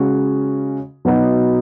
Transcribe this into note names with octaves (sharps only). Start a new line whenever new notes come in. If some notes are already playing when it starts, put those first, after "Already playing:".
Already playing: C#3 G#3 C#4 F#4
B2 F#3 B3 D#4